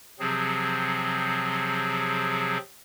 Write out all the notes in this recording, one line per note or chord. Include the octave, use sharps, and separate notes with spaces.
C3 F3 F#3 C4 G#4